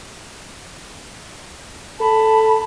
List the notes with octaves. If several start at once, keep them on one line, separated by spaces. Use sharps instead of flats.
A4 A5 B5